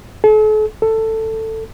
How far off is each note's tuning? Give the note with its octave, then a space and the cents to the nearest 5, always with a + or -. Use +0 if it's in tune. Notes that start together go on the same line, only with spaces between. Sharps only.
A4 -45
A4 +10